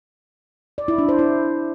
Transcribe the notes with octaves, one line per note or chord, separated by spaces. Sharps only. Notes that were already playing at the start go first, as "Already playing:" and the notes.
D5
E4
D4
C5
E4